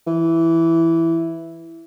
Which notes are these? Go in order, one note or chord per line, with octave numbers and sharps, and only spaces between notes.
E3